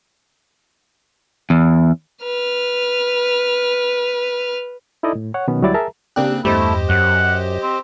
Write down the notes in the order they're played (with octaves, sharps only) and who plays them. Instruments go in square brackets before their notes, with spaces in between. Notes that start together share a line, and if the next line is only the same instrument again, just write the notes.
[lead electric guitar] E2
[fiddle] B4 F6
[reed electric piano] D#4 E4 A4 D5 D#5
A2
C#5 F#5
B2 D#3 F#3 B3 C#4
D2 F#3 G3 E4 D5 A6
G#4 A#4 E5 A5 A#5
[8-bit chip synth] C#3 C4 F#6 [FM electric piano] A#3 D4 G4
[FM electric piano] E2 G2 [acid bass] A3 [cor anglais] E4 [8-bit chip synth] G4 C5 D#5
[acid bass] F#2 [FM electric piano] F#3 [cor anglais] F#5
[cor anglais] C4